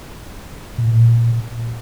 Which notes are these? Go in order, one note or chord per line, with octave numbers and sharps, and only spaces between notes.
A#2
A2
A#2